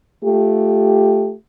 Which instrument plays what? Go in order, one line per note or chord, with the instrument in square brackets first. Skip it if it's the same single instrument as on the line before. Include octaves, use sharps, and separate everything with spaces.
[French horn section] A3 F4 G4